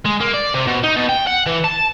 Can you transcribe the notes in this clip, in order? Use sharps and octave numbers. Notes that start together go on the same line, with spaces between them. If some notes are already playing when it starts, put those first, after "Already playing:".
G#3
A#3
D5
C3
B2
D#4
B2
G5
F#5
E3
A5